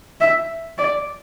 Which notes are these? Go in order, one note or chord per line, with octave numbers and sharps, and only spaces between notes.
E5
D5